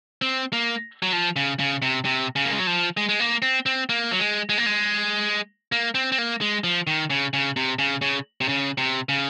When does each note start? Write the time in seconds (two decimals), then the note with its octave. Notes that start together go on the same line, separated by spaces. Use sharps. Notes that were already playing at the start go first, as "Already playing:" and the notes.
0.22 C4
0.53 A#3
1.02 F#3
1.13 F3
1.36 C#3
1.59 C#3
1.82 C3
2.05 C3
2.36 C#3
2.45 A#3
2.51 G#3
2.59 F#3
2.67 F3
2.97 G#3
3.09 G#3
3.20 A#3
3.42 C4
3.66 C4
3.89 A#3
4.11 F#3
4.19 G#3
4.49 G#3
4.58 A#3
4.66 G#3
5.72 A#3
5.95 C4
6.12 C4
6.18 A#3
6.41 G#3
6.64 F3
6.87 D#3
7.10 C#3
7.33 C#3
7.56 C3
7.79 C#3
8.01 C#3
8.41 C3
8.48 C#3
8.78 C3
9.09 C#3